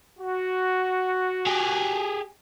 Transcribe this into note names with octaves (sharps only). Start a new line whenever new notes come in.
F#4
G4 G#4